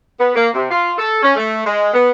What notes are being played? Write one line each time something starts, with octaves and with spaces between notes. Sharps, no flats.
B3
A#3
C3
F4
A4
C#4
A3
G#3
B3